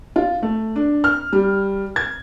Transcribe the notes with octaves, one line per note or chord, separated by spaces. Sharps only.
F4
A3
D4
F6
G3
G#6